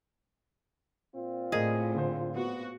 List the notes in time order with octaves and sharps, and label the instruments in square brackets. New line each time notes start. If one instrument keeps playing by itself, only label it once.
[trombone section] A#2 C4 F4
[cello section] A2 [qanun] G#4 [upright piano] A#4 D5 D#5
[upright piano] D3 C5
[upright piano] B3 [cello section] F#4